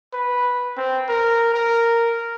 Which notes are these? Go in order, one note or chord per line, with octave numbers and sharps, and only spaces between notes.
B4
C4
A#4
A#4